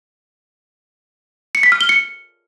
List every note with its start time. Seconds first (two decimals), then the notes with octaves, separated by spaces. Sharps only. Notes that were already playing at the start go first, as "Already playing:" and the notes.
1.55 C#7
1.63 B6
1.72 F6
1.81 G7
1.89 C#7